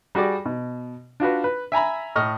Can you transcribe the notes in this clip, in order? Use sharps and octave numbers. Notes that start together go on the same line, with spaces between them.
G3 F#4 G#4 D5
B2
D4 F4 F#4 B4
B4
E5 G#5 A#5 B5
A2 D#5 C#6 F6